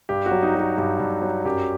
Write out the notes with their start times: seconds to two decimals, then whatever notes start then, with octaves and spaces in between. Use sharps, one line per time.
0.09 G2 G4
0.26 F#4
0.31 F#3
0.43 D#4
0.55 F#3
0.60 F#4
0.77 G2 G4
1.00 G2
1.22 F#3
1.45 F#2 G4